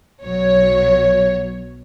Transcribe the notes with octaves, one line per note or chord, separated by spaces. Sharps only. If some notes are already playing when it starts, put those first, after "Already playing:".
B1 F#3 C#5